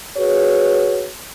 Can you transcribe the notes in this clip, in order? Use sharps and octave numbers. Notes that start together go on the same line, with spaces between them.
F#4 G#4 B4 C#5